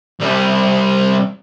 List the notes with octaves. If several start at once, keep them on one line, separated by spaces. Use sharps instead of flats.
C2 G3